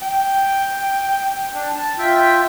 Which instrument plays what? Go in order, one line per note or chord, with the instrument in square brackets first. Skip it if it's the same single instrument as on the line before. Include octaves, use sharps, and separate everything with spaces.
[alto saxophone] G5
[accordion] D4
A5
F4 E5 G5